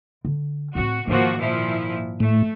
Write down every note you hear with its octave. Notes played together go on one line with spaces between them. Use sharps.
D3
A2 C4 F#4
G#2 D#3 F3 A#3 F#4
A#2 F3 E4
A2 A3